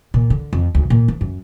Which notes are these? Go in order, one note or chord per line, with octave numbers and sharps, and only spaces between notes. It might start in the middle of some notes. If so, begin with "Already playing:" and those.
A#2
D3
F2
D2
A#2
F3
F#2